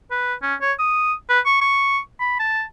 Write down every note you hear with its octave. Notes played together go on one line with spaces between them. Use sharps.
B4
C#4
C#5
D#6
B4
C#6
C#6
B5
A5